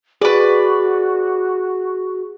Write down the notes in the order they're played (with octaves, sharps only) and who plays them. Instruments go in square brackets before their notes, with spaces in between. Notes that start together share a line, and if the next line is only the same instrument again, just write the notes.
[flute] F#4 [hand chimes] G#4 [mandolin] B4 D5